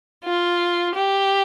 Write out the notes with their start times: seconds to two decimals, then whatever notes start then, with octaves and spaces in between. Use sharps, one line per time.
0.24 F4
0.95 G4